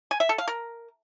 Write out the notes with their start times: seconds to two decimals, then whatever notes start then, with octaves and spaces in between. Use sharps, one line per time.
0.11 G#5
0.20 E5
0.29 A4
0.38 F5
0.48 A#4